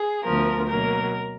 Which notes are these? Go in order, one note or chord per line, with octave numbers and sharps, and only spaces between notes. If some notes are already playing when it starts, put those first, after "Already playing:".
Already playing: G#4
D2 D3 F3 B3 A#4
B2 F#3 A#3 A#4